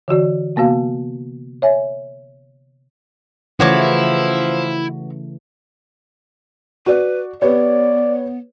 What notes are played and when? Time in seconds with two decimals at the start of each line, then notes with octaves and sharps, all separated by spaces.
0.08 D3 E3 F#4 D5
0.56 C3 A#3 B3 F#4 F5
1.62 C#5 E5 G#5
3.60 C#3 E3 F3 A3 E4 F#4 C#5 D6
6.86 F#4 B4 D5
7.42 B3 G4 B4 C#5 D5